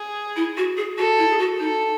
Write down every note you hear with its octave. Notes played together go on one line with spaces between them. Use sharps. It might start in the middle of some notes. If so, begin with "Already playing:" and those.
Already playing: G#4
E4
F#4
G#4
F#4 A4
E4
G#4
F#4
D#4 A4